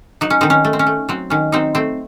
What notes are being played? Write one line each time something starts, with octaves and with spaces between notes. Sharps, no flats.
F#3 D#4
C#4
D#3 C4 D#4
C#4
A3
C4
C#4
A3
F#3 C4
D#3 C#4
F#3 C4 D#4
A3 C4